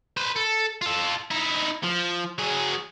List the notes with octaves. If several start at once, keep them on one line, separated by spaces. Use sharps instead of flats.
B4 C5
A4
F4 A4
D#4 E4
F3
F#3 G#4